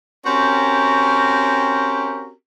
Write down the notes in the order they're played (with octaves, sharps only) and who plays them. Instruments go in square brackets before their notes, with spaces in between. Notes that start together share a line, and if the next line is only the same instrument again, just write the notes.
[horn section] C4 C#4 F#4 G4 A#4